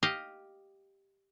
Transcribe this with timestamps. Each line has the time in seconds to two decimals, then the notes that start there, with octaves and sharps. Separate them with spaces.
0.03 G4 D#5 F5